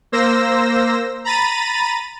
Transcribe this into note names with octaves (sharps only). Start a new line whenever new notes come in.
A#3 C5 E6 A#6
A#5 B5 A6 D#7